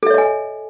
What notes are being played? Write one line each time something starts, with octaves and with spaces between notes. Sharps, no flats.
A4 C#5 D#5 E5 G#5